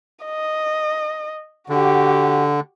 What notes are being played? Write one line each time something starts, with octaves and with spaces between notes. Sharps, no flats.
D#5
D3 F#4 G4